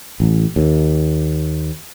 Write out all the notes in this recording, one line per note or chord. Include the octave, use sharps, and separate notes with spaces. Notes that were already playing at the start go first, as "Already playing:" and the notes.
A1
D#2